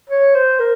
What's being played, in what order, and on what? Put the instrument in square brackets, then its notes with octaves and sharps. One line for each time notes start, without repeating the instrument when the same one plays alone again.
[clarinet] C#5
C5
A#4